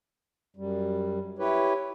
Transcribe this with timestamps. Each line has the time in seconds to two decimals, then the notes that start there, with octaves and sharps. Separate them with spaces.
0.56 F#2 G3
1.39 E4 G4 B4 C#5